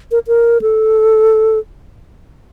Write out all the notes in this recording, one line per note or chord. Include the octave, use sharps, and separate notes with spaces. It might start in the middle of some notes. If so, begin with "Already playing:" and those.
A#4
A#4
A4